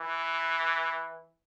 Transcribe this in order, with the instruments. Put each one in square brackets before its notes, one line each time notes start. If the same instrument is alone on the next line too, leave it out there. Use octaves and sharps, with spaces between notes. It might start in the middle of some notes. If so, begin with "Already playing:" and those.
Already playing: [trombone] E3